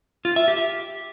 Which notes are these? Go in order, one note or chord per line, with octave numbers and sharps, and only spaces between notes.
F4
E5
G4